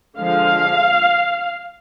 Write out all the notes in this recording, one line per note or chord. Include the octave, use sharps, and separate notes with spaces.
D3 F3 G#3 F5